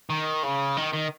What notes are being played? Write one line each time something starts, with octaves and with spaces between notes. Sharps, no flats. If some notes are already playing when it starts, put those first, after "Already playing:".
D#3
C#3
D#3
D#3